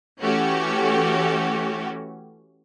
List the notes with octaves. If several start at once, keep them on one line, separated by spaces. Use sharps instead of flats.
E3 A3 C#4 F#4 G4